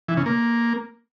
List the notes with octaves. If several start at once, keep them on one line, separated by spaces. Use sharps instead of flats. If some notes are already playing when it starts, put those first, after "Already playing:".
E3
C#3
A#3